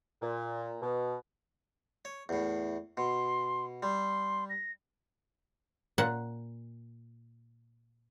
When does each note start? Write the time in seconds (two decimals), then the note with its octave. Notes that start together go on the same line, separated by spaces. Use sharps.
0.21 A#2
0.81 B2
2.05 C#5
2.29 E2 A2
2.97 B2 C6
3.83 G3 C6
4.50 A#6
5.98 A#2 F#5